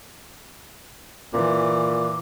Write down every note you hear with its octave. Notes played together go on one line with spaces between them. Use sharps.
A#2 E3 D6